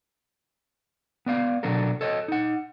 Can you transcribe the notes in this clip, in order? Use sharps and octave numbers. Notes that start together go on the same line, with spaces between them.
B3 D5 F5
B2 F#3 D4 A4 A#4
A4 C#5 D#5
D#4 F#5